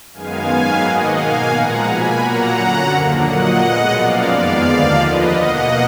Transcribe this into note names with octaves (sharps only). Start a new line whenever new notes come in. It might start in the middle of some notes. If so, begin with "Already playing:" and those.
F#2 D#3 G#3 B3 F5 G#5
G#2 D#3 F#3 B3
G#2 D#3 A#3 D#5 F#5
B2 A#3 F5 G#5
A#2 F3 G#3 F#5 A#5
B2 A#3 G#5 B5
A#2 F#3 A#3 F#5 A#5
F#2 D3 F#3
D#2 D3 F3 A#3
A#2 F#3 A#3 D#5 F#5
B2 G#3 B3
F#2 F3 A#3 D5 F5
F2 D#3 G#3 B3 D5 F5
D#2 D3 F3 A#3 D5 F5
D#2 D3 F3 B4 D#5
B2 A#3 D#5 F#5